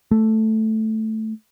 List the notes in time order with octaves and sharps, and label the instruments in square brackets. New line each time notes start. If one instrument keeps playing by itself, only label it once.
[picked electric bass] A3